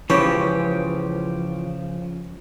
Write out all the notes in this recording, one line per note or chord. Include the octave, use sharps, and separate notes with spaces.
C#2 C#3 E3 F3 C#4 G4